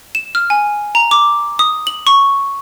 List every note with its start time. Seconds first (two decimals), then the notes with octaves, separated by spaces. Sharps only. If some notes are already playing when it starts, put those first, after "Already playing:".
0.15 E7
0.35 F6
0.50 G#5
0.95 A#5
1.11 D6
1.59 D#6
1.87 F#7
2.07 C#6